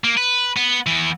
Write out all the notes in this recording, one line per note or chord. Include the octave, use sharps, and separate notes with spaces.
A#3
B4
B3
E3 B3